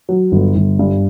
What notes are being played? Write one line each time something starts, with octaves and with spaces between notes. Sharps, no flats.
F#3
G1
G1
G2